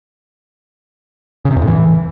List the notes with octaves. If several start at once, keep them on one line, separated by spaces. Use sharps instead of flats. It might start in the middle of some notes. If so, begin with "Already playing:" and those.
C#3
C3
E2
A2
E3